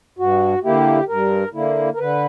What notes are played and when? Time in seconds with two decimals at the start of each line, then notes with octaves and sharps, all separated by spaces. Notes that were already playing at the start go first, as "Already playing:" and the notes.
0.18 G2 F#4
0.64 D3 A#3 E4 G4
1.08 G2 A#4
1.53 D3 A#3 E4
1.94 A#4
1.99 D3 B4